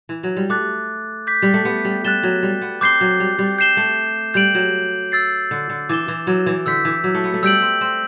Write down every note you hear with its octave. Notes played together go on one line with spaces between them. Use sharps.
E3
F#3
G3
A3 D6 F#6 A6
D6 G6 B6
G3
A3
B3
G3
G3 F#6 A6 E7 G7
F#3
G3
B3
C4 D6 G6 C7 G7
F#3
G3
G3
G6 C7 E7 G7
A3
G3 G6 D7 F#7
F#3
E6 A6 C7
D3
D3
E3 D6 A6 E7 G7
E3
F#3
E3
D3 E6 G6 B6
E3
F#3
A3
B3
A3
G3 E6 G6 D7 F#7
C4
C4